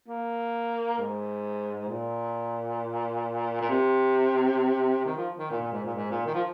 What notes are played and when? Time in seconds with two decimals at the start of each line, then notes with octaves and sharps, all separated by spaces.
0.08 A#3
0.99 G#2
1.89 A#2
3.61 A#2
3.69 C3
5.05 D#3
5.17 F3
5.39 D#3
5.50 A#2
5.62 A#2
5.72 G#2
5.84 A#2
5.95 G#2
6.10 A#2
6.26 D#3
6.34 F3